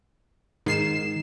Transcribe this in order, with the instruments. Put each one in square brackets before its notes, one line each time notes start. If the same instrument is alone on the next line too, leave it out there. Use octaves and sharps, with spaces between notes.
[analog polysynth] G#2 C7 E7 [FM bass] D#3